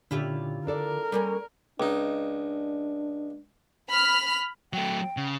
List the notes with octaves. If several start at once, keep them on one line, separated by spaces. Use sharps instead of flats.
A#2 D3 C#4 E4 F4 G4
D4 A4 A#4 D5
G3 A#3 C#4
C#2 D4 D#4
B5 F6
F#3 A3 G5
C#3